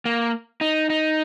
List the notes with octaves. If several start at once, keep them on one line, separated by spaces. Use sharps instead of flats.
A#3
D#4
D#4